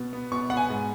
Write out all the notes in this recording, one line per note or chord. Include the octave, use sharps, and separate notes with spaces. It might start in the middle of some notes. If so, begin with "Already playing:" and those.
Already playing: B2 B3
B3
B2 C#6
B3 F#5
G#5
G#2